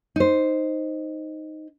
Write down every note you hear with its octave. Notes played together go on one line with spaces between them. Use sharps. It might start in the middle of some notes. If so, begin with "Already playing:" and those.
D#4 C5